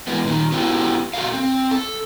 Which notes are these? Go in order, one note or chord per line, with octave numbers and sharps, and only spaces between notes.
E3 G#3 B3
A#2 D#3
B3 C#4 E4 F#4 G4
F#4 A4 A#4 F5
C4
A4